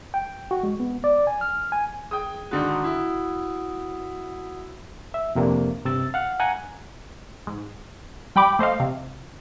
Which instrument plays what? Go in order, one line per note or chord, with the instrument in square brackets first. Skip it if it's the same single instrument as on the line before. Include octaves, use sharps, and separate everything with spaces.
[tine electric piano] G5
F#4
G#3
B3
D5
G#5
F6
G#5
[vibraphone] G#4 [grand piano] G5 D#6
[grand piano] G#2 D3 D#3 [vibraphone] F#4 F#5 D#6
[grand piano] E4
[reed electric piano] E5
F2 C3 A#3 D4
G2 C3 E6 A6
F5 F#5
F#5 G#5 A#5
[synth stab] G#2
G3 G5 B5 D6
A3 C5 D#5 F5
C3